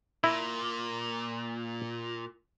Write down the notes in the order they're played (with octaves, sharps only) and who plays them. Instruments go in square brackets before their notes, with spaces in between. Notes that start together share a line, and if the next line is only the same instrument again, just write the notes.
[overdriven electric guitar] A#2 [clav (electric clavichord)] E4